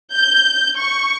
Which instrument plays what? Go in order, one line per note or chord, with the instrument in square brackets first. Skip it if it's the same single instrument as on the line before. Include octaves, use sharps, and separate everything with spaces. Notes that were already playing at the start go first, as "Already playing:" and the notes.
[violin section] G6
C#6